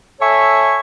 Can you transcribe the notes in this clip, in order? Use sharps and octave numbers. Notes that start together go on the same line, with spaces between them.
A4 C#5 E5 G#5 C#6